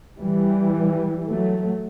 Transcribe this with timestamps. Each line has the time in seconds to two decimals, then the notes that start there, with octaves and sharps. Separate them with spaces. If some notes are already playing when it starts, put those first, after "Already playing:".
0.17 E3 G3
1.29 F#3 A3